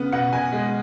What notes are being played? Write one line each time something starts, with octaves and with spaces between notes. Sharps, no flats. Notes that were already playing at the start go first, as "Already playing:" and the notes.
Already playing: C#3 B3
B2 F#5
B2 G#5
G#3